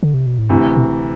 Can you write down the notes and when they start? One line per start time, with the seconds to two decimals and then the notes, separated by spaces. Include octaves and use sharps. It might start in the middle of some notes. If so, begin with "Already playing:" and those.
0.03 D3
0.14 C3
0.26 B2
0.38 A2
0.49 D2 G2 C3 E3
0.77 B2